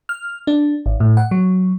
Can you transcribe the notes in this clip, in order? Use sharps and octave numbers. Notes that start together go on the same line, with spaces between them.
F6
D4
G#1
A2
F#5
F#3